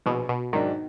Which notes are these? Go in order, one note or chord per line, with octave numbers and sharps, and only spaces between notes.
A#1 B2
B2
G#2 D#3 F#3 D4